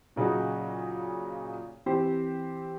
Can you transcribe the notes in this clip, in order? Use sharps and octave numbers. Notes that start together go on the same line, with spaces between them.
A#2 C#3 F#3 D#4 F#4
E3 C4 G4 C5